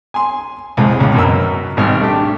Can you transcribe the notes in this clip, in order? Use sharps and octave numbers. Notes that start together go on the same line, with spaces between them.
G#5 C6
C2 F2 G#3
C#2 C#4
F#2 B2 A#4 E6
G#1 B2 G3 F6
A3 D4 G4